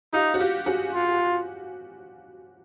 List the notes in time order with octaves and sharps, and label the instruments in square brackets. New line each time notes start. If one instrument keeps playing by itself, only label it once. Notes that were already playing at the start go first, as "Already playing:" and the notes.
[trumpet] D#4 [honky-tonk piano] F4 G4
[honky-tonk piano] F#4
F4 G4
F#4 G#4
[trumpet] F4